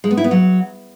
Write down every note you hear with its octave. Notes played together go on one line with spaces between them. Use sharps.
G#3
B3
E4
B3
F#3